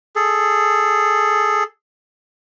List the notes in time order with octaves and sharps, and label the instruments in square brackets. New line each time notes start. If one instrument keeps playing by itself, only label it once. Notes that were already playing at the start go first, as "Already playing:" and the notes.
[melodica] G#4 A4